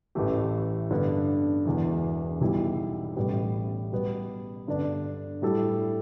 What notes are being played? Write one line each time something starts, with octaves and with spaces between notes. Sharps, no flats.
A1 A2 E3 A3 G4
G2 D3 B3
E1 E2 E3
B1 B2 G3 E4
A1 A2 G3 B3
B2 G3 B3
G2 D3 B3 D4
A2 G3 E4 A4